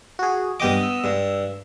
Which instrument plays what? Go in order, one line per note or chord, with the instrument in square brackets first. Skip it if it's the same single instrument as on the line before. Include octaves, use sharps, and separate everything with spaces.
[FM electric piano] F#4 G#4
[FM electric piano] G2 G4 D6 [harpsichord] B3 D#5
[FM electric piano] E6
[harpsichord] G2